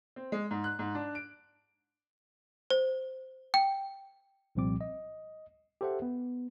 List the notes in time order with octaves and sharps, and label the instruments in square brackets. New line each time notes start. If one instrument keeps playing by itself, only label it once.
[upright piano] C4
G#3
G#2
F#6
G#2
D4
D7
[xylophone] C5
G5
[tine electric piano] C2 A#2 F3 G3 C4 D6
D#5
G4 A4 C5 E5 F#5
B3